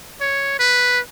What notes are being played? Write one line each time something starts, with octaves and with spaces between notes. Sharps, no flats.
C#5
B4